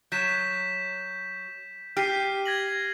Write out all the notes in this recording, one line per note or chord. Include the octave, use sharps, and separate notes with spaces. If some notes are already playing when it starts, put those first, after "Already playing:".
F#3 G6 B6 E7
G4 F6 C7 D#7
G#6 A#6 F#7